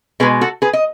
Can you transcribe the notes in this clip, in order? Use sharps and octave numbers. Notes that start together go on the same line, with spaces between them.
B2 G#3 G#4 B4
F#4 A4
G#4 B4
D#5